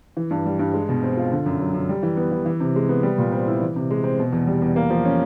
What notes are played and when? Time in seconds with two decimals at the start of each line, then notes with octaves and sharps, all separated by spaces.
0.17 E3
0.31 G2
0.46 G3
0.59 G2
0.74 G#3
0.89 B2
1.03 C4
1.17 F4
1.32 D3
1.46 F#2
1.60 F#3
1.74 F#2
1.89 G3
2.03 E3
2.17 B3
2.32 E3
2.46 E3
2.60 C3
2.76 G#3
2.89 B3
3.03 G3
3.18 A#2
3.32 C4
3.47 E4
3.62 E3
3.76 C3
3.90 G#3
4.04 C4
4.19 B2
4.32 E2
4.47 G3
4.62 E2
4.76 A#3
4.90 F3
5.05 C#4